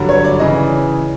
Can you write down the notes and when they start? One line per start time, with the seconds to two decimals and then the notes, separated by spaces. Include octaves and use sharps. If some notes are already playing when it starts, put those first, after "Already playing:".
Already playing: G2 D3 F#3
0.09 C#5
0.25 D5
0.39 C#3 E3 D#5